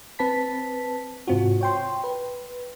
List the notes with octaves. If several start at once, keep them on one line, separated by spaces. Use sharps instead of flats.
C4 B4 A5 B6
G#2 C3 C4 F4 F#4
C#5 G5 C6
B4